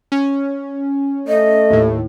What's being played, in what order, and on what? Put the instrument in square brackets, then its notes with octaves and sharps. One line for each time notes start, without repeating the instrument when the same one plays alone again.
[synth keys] C#4
[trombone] A3 [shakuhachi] D#5
[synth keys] D#2 A2